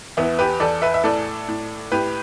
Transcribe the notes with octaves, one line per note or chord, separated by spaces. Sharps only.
E2 B3 E4
G4 B4
E2 A4 D5
B4 E5
E5
A2 A4 D5
A2
A2 G4 B4